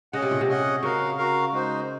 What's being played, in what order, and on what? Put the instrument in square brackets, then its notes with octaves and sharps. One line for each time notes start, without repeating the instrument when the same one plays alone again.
[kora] C#3 [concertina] C#4 G#4 D#5 F#5
[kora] C3
A#2
C3
[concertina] C#4 G#4 D#5 F#5
[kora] C#3 [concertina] F#4 A#4 F5
[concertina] F#4 A#4 F5
G#3 D#4 F#4 C5